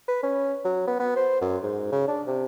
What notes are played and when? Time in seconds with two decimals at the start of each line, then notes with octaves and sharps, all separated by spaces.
0.08 B4
0.23 C#4
0.65 F#3
0.87 B3
1.00 B3
1.16 C5
1.41 F#2
1.63 G#2
1.92 C#3
2.08 D4
2.27 C3